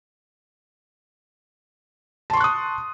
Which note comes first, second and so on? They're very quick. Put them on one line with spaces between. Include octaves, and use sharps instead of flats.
A5 C6 C#6 F#6 D#6